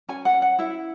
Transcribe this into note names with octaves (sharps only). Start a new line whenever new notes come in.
C#4 G#5
F#5
C#4
F#5
E4 E5